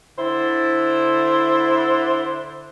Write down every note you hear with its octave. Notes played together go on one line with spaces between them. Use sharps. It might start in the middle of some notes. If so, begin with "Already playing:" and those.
D3 E4 C5